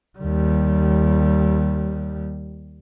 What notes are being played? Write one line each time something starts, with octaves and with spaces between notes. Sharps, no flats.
D#2 G3